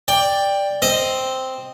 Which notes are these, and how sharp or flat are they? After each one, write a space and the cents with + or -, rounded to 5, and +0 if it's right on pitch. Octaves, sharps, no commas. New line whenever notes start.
D5 +0 G5 +15
C4 +0 D#5 +0